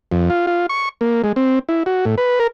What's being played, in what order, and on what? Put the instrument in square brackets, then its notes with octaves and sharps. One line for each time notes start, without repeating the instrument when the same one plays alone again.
[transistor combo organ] F2
F4
F4
C#6
A#3
G#3
C4
E4
F#4
A2
B4
A#4